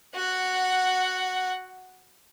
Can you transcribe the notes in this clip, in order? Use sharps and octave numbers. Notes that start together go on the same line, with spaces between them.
F#4 F#5